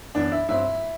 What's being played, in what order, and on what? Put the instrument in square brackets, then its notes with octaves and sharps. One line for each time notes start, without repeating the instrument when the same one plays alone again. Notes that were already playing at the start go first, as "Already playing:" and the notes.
[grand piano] F#2 E3 B3 D4
E4
G2 F#3 C4 E4